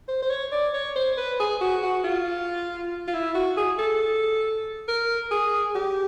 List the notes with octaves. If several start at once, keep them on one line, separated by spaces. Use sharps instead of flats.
C5
C5
C#5
D5
C#5
C5
B4
G#4
F#4
F#4
F4
F4
E4
F#4
G#4
A4
A#4
G#4
G4